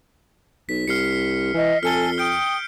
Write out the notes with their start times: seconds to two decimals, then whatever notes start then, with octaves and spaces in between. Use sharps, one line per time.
0.69 B1 B6
0.88 C2 F6 C7 C#7
1.54 E3 D#5
1.83 F2 A4 G#5 F6 C#7 G7
2.18 G5 D#6 F6 G6 D7